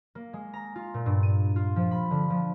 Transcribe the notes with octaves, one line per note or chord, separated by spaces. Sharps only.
A#3
G#3
A#5
F4
A#2
G2
D#7
F4
F3
B5
D3
F3